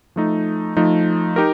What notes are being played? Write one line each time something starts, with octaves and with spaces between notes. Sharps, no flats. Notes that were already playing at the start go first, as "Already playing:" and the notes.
F3 A3 D#4
F3 A3 D#4
D#4 G4 A#4